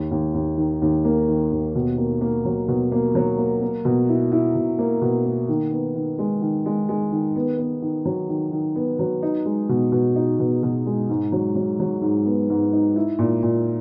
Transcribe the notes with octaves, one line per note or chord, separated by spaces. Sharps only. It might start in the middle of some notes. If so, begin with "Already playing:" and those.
Already playing: D#2
D#2
D#2
D#3
D#2
A#3
D#3
D#2
B2
A#3
A#3
F#3
B2
A#3
F#3
A#3
A#3
B2
E4
E4
B2
A#3
B2
A#3
D#3
B3
D#3
G#3
D#3
G#3
G#3
D#3
B3
B3
D#3
F#3
D#3
D#3
B3
F#3
D#4
G#3
B2
B2
D#4
B2
B2
G#3
G#2
F#3
F#3
F#3
G#2
B3
G#2
D#4
E4
A#2
A#2